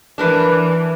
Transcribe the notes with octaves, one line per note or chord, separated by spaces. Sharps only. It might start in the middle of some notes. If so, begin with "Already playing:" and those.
E3 D4 A#4 B4